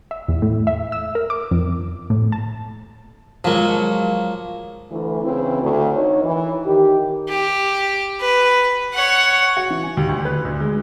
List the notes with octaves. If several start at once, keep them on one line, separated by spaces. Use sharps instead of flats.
E5
E2
A2
E5
E6
A#4
D6
F2
A2
A5
F3 F#3 G#3 A#3
D2 E3
C#3 E3 C4 E4
D2
D#3 C#5
E3
D#3 G4
G4
B4
C#5 F#5
F#4
E3
G#5
D#2
D2
B4
D2
G#3